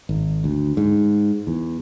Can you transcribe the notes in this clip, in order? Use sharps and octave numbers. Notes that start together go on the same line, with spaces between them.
G#1
D2
G#2
E2